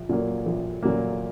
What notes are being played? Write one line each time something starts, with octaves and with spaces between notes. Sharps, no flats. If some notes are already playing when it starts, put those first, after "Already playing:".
Already playing: A#1
A#2 F#3 A#3
A#1
A#2 F#3 A#3